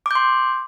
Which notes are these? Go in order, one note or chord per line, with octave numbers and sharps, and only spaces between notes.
C6 D6 G6